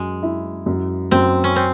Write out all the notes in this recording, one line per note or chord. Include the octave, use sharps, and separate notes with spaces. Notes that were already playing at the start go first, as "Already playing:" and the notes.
Already playing: F#2 G#3
E4
F#2
F#2 C4
C#4
C4